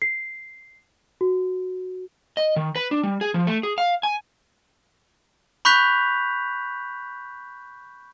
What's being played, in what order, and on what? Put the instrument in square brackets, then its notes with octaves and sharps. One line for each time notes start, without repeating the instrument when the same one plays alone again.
[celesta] C7
F#4
[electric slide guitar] D#5
D#3
B4
D4
G3
G#4
F3
A3
G#4
F5
G#5
[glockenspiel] B5 C#6 F#6 G6 B6 F7